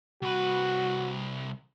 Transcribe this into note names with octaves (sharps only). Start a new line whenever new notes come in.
C2 F#4 B4